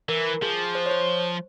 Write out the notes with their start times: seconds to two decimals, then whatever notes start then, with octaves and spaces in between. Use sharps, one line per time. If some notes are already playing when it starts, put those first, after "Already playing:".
0.09 E3 A#4
0.42 F3 G#4
0.75 C5
0.86 C#5
0.91 C5